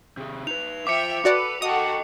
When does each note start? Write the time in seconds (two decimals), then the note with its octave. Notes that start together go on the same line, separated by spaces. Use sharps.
0.17 C3 G#4
0.47 D#4 B4 F7
0.87 C5 E5 F5 G5 D6 C#7
1.25 F#4 A4 B4 D5 F#5
1.62 F#4 A4 D#5 F#5 G5 D#6